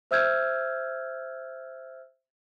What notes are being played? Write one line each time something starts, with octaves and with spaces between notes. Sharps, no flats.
C5 E5 E6 F6 G6 G#6